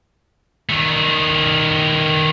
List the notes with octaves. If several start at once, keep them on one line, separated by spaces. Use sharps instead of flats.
D#3 A3